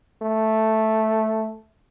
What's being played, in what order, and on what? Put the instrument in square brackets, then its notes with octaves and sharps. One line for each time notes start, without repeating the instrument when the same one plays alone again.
[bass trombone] A3